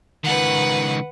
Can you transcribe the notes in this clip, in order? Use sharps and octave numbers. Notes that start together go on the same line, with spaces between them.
C#2 D#3 B4 F#5